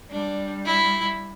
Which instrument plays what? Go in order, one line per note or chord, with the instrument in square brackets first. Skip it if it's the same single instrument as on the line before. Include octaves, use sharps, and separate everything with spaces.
[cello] G3 [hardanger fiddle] D4
[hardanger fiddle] E4